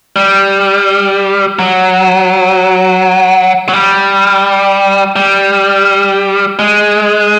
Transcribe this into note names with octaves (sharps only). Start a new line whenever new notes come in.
G3
F#3
F#3
G3
G3
G#3